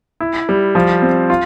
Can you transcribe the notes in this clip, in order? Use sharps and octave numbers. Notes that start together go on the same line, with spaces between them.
E4
G3
F3
C4
F4